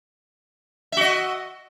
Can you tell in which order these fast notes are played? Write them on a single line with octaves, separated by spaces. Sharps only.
E5 F#4 D#5